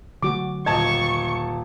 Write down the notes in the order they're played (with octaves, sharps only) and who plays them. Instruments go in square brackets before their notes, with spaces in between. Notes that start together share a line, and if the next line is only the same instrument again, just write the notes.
[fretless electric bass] D3 F#3 A3 [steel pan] F#4 D6
[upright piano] D#1 A5 G#6 [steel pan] D#5 [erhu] C#6